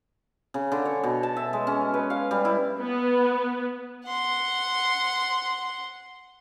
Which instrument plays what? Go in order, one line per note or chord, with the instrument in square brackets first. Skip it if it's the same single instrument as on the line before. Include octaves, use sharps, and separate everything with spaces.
[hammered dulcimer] C#3
D3
C#5
B2
A5
E5
G#3
C#4
B4
F5
G3
E4
[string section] B3
[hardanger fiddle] F#5 C6